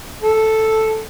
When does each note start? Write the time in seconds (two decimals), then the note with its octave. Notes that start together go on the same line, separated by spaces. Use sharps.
0.22 A4